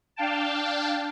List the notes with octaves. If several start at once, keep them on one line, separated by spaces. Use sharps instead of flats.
D4 F5 G5 A5